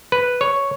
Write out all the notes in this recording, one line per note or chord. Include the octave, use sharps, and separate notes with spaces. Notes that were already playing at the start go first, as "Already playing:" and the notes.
B4
C#5